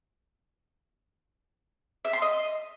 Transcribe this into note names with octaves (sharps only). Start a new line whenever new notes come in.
E5
C6
D#5